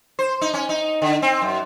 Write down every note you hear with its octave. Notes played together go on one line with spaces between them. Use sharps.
C5
D#4
C#4
D#4
D3
C4
F#2